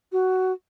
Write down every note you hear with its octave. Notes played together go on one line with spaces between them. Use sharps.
F#4